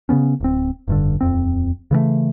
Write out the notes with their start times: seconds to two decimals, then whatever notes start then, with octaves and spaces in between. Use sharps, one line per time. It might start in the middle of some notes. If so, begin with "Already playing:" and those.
0.09 C#3 E3 B3 C#4
0.41 D1 C4
0.88 F1 G2 D3
1.21 D#1 F2 C4
1.91 C#3 E3 G3 A3